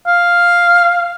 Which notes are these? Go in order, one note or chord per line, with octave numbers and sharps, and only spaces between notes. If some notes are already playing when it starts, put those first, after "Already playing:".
F5